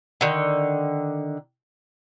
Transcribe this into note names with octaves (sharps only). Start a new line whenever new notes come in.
D3 D#3